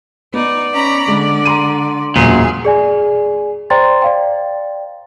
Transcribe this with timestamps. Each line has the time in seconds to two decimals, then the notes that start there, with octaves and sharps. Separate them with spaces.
0.34 B3 D#4 D5
0.72 C#4 A#5 B5
1.08 D3 G#3
1.45 A#5 C6 D#7
2.16 E1 F#2 A#2 G#4
2.65 G#4 D5 G#5
3.70 C5 D5 G5 A#5 C6 A6
4.02 D5 F5 G5